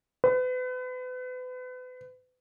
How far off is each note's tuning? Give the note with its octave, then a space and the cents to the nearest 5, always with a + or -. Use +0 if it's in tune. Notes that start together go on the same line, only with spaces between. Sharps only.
B4 +35